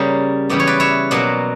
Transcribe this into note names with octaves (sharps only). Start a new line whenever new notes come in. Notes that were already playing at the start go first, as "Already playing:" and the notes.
Already playing: C#3 G3 A#3
C#3 E3 G3 B3 D5
C#5
B4 D5
C#5 E5
B2 F#3 A#3 D5 F#5